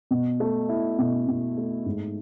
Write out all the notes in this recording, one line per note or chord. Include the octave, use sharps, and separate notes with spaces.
B2
A3
E4
B2
B2
A3
G#2